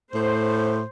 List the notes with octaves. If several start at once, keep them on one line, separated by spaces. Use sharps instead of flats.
A2 C5